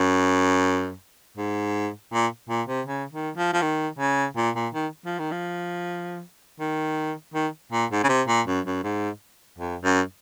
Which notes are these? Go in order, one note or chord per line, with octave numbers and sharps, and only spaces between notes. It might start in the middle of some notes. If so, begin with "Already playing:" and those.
Already playing: F#2
G#2
A#2
A#2
C3
C#3
D#3
F3
F3
D#3
C#3
A#2
A#2
D#3
F3
D#3
F3
D#3
D#3
A#2
G#2
C#3
C3
A#2
F#2
F#2
G#2
F2
F#2